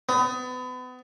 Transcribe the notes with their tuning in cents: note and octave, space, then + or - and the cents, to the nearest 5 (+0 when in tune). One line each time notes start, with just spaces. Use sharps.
B3 +35